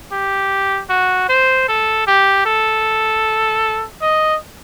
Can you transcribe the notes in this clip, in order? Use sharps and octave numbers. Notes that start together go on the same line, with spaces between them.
G4
F#4
C5
A4
G4
A4
D#5